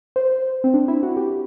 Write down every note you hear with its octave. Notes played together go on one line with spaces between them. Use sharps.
C5
C4
D4
E4
F#4
G4